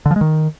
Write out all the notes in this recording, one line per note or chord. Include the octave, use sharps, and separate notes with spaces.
D3
F3
G#3
D#3